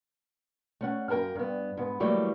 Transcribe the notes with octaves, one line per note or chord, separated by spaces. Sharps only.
A3 C#4 F#5
F#2 A#3 A4 A#4 G5
G2 B3
G#2 B3
E3 F#3 G3 A3 A#3